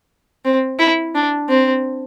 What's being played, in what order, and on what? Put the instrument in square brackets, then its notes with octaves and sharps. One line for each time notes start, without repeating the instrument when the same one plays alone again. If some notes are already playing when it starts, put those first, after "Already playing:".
[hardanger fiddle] C4
E4
D4
C4